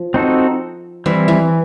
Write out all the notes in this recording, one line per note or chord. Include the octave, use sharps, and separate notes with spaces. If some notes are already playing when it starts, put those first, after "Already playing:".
Already playing: F3
C4 D#4 F#4 A4
E3 G3 C4 E4
E3